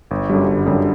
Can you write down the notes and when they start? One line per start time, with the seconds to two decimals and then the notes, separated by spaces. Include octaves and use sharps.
0.11 G1
0.29 F#2 D3 G3
0.48 G1
0.66 F#2 D3 G3